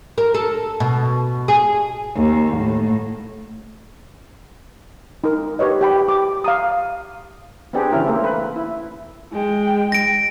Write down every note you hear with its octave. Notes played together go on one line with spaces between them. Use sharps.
A#4
A4
B2
G#4
D#2
A2
D#4 A#4
G4 B4 C#5 D#5
G4 G5 B5
G4 D6
F5 A#5 D#6
B3 C4 D4 G4 G#4
C#3 E3 C#4 E4 A#4
A3 A#3 C4
B4
E4
G#3 G5
A#6 D7